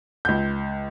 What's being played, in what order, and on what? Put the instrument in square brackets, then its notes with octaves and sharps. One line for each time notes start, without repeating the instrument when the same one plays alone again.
[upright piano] C#2 G6